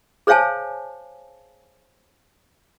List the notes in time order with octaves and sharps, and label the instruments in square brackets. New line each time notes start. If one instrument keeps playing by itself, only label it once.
[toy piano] G#4 C5 C#5 F5 G#5 A5